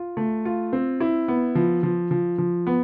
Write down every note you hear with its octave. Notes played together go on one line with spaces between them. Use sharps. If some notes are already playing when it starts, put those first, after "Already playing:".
Already playing: F4
A3
F4
C4
E4
B3
F3
F3
F3
F3
B3